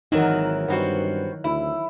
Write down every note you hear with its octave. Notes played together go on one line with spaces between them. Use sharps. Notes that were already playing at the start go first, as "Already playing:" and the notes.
G#1 D#3 E3 F#3 D#4 A#4
G2 B3 C4 F#4
D2 E4